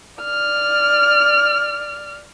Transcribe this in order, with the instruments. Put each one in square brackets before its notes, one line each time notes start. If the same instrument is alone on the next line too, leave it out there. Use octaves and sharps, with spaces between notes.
[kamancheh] D5 F6